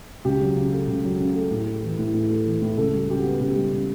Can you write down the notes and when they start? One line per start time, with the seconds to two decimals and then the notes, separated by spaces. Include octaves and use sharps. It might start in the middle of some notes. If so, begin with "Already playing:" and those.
0.25 C#2 G4
0.41 F#3
0.56 C#3
0.72 A3
0.88 C#2
1.04 F#3
1.20 C#3
1.35 A3
1.51 A2
1.66 A3
1.83 E3
1.99 A2
2.14 A2
2.30 A3
2.46 E3
2.62 A2
2.78 C#2 A4
2.93 G3 G4
3.09 C#3 G4
3.19 F#4
3.25 B3
3.41 C#2 G4
3.56 G3
3.72 C#3